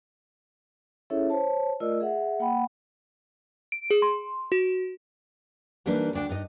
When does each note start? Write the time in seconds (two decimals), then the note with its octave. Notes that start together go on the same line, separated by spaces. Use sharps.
1.10 C#4 E4 G#4 A4 C#5 E5
1.30 C5 C#5 A5
1.80 A3 F4 A#4 D5 D#5 E6
2.00 G#4 E5 F#5
2.40 A#3 F#5 G5 B5
3.72 D7
3.91 G#4
4.02 C6
4.52 F#4
5.86 E3 G3 A#3 D4 D#4 B4
6.13 D2 D4 G5
6.29 G2 D#4 D#5